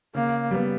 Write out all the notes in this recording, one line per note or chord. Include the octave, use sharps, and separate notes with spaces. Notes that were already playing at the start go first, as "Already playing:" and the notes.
C#3 A#3
G3 B3